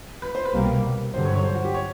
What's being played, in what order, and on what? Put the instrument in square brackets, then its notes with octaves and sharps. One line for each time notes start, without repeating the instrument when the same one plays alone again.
[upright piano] B4
C5
B4
[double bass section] C2 B2 G3 A#3
[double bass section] G2 D3 F#3 [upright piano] C5
[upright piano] C#5
C#5
C5
F#4
G4
C#5